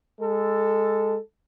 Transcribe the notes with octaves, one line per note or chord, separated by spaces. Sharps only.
G#3 A4